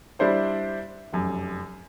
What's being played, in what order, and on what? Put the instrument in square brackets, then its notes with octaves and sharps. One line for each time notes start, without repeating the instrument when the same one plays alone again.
[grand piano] G3 D4 E4 C5 D5
F1 F#2